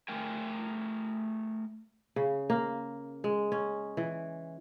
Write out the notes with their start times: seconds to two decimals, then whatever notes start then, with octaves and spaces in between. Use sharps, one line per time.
0.08 A3 A#4 G5 G#5
2.16 C#3
2.50 A#3
3.24 G#3
3.52 C#4
3.97 E3